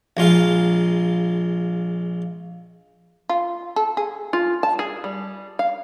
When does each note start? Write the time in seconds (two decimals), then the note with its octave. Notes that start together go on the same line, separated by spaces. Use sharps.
0.17 A#1 G#3 F4 F5
3.29 F4
3.76 A4
3.97 G#4
4.33 F4
4.63 A5
4.79 G#4
5.04 G3
5.59 F5